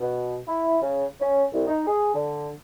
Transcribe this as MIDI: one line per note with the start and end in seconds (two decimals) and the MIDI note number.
0.01 0.37 47
0.47 0.77 64
0.82 1.06 49
1.21 1.45 61
1.53 1.65 36
1.67 1.84 63
1.87 2.13 68
2.14 2.50 50